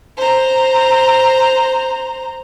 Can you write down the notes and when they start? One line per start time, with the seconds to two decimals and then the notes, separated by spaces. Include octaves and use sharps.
0.17 C5 A#5